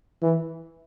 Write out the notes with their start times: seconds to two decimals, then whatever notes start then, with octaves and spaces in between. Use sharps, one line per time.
0.22 E3